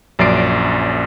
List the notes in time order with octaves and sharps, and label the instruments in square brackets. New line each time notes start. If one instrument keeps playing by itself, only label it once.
[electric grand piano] A#1 F#2 C#4 D5 C7 D7